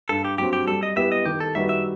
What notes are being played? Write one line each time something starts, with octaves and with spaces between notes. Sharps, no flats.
G2 A4
G4
F#3 C4 G4
G4
G3 A4
D#5
B3 E4 G4 E5
D#5
D#3 G4
A4
G3 D#4 F#4 B4 E5
E5